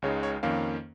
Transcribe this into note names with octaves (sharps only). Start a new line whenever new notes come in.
C#2 C#3 G#3 D#4 C#5
C#5
F2 D#3 A#3 C#4 F5